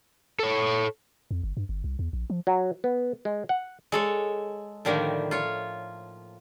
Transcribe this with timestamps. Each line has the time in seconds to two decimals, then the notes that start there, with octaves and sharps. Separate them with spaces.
0.40 A4 C#5
1.31 F2
1.43 G1
1.57 G2
1.69 G1
1.84 C2
1.99 E2
2.13 A#1
2.30 F3
2.47 F#3
2.84 B3
3.25 G#3
3.49 F#5
3.92 G#3 A4 C#5
4.85 A2 D3 D#3 F3 G3 A#3
5.31 F4 C#5